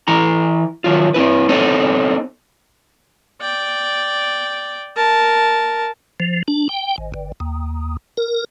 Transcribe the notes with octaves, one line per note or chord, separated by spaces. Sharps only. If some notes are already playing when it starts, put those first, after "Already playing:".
E3 E4 A#5
D#3 F#3 F4
C4 E4 B4
B3 C4 D#4 A4 C#5
D5 G5
A#4 A5
F3
D4
G5
G#1
G1
D#2
A#4